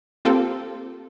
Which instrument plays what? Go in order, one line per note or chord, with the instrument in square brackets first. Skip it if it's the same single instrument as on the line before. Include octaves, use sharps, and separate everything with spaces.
[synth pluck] A#3 C4 F4 G4 A4